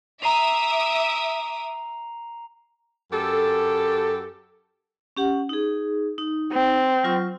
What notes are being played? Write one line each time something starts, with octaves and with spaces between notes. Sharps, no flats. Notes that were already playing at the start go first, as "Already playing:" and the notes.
E5 A#5 D6 D#6 C7 F7
F#2 G4 A4
C#4 G4 F#5
D#4 G#4
D#4
C4
F#3 F4 C#6